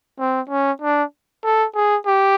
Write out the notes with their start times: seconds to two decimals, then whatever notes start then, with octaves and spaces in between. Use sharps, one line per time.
0.19 C4
0.50 C#4
0.82 D4
1.44 A4
1.75 G#4
2.06 G4